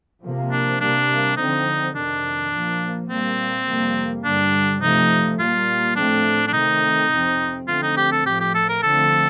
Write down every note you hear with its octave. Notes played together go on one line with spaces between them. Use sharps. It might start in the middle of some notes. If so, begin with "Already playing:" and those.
C3 F3 A#3
D4
C3 G3 A#3 D4
D3 F3 C4 D#4
F2 C3 D#3 D4
A#2 F3 A#3
A#2 G3 A#3 C4
F2 C3 G3 A#3
G2 D3 G3 D4
C3 F3 A3 D#4
A#2 G3 A#3 F4
A2 F3 A3 C4 D4
D4
C3 D#3 A3 C4 D#4
F2 C3 F3 C4
D3 F3 A3 C4 F4
D#4
G4
A4
A2 F3 A3 G4
G4
A4
A#4
D3 F3 A3 C4 A4